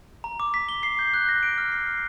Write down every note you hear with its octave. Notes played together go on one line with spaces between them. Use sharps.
A#5
D6
B6
G7
C7
G6
F#6
A#6
D7
F6
C7
F6